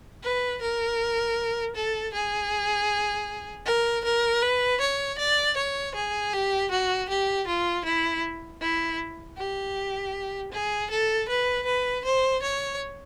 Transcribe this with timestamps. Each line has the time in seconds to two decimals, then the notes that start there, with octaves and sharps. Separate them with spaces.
0.23 B4
0.61 A#4
1.75 A4
2.14 G#4
3.66 A#4
4.04 A#4
4.42 B4
4.81 C#5
5.18 D5
5.57 C#5
5.95 G#4
6.33 G4
6.71 F#4
7.09 G4
7.47 F4
7.85 E4
8.61 E4
9.37 G4
10.52 G#4
10.90 A4
11.29 B4
11.66 B4
12.05 C5
12.42 C#5